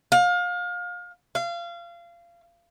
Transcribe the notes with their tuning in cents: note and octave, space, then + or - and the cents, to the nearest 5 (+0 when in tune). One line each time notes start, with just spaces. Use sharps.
F5 +30
F5 -25